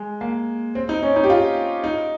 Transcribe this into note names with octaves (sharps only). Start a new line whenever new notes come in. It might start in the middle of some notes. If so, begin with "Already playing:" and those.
Already playing: G#3
A#3
C4
D#4
C#4
D#4
G4
F4
D#4